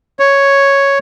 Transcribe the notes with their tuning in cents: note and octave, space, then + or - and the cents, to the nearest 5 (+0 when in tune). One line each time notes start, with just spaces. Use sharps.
C#5 +0